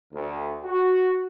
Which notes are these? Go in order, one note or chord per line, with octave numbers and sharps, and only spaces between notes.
D2
F#4